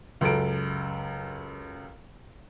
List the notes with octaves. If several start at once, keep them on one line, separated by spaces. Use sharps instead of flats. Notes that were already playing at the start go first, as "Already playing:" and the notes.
C#2 F#2 A4 D7